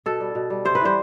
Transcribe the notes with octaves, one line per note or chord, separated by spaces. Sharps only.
B2 A4
G3
B2
G3
C3 C5
B4
E3 G3 C5